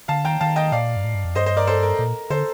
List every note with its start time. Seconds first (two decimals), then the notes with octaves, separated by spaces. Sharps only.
0.08 D3 F5 A5
0.25 D#3 G5 A#5
0.41 D#3 F5 A5
0.56 D#5 G5
0.72 A#2 D5 F5
0.96 G2
1.04 A2
1.15 G2
1.25 F2
1.35 G2 C5 D#5
1.46 C5 D#5
1.57 A#4 D5
1.67 A4 C5
1.83 A#4
1.99 A#2
2.30 D3 A4 C5